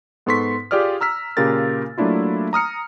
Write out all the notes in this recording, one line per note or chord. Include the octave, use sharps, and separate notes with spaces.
G#2 B3 A4 C6 C#6 B6
F4 G4 G#4 D5 D#6 F6
A#5 E6 F6 B6
A#2 C#3 F4 G4 A#4 A6
F#3 A3 A#3 D4 E4 F4
A#5 D#6 F6 C#7